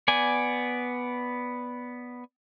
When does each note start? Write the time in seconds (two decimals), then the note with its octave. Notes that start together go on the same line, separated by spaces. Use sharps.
0.08 B3 D5 G#5